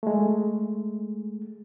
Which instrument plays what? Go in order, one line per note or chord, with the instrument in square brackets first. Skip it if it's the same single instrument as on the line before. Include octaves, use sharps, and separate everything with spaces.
[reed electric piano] G#3 A3